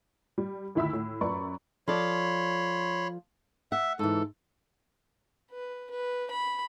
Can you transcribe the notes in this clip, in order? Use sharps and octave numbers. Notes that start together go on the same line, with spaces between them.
G3
D2 D#3 E4 E5 B5 E6
A2
F#2 B4 D5 B5 C#6
F3 A4 C#5 D5 B5 C6
E5 F#5
G#2 E3 A4
B4
B4
B5